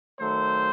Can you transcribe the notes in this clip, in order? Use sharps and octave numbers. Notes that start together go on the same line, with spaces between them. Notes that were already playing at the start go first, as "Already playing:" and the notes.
D#3 F#3 A3 C5